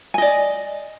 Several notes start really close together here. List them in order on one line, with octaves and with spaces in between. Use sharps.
G#5 D#5 D5